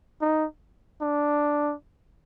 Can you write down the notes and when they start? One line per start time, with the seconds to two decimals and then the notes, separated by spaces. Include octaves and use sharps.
0.22 D#4
1.02 D4